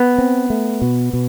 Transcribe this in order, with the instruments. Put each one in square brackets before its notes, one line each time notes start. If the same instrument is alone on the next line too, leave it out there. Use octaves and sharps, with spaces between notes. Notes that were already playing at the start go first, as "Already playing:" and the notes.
Already playing: [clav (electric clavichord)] B3
[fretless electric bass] C4
A3
B2
B2